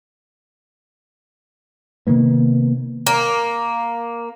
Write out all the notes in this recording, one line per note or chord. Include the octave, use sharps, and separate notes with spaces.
C3 D#3 A#3 B3
A#3